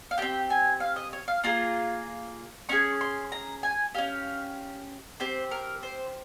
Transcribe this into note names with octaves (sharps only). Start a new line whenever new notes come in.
F5
C4 G4 G5
G#5
F5
D#5
C#5
F5
A#3 F4 G#4 A#5
C#4 F4 G#4 C#6
C6
A#5
G#5
C#4 G4 F5
C4 G4 C5
A#4
C5